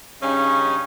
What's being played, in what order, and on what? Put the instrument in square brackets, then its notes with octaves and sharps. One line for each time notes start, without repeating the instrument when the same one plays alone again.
[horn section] G2 C#3 C#4 D#4